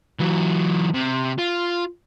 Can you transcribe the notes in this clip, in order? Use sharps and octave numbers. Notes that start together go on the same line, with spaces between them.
E3 F#3
C3
F4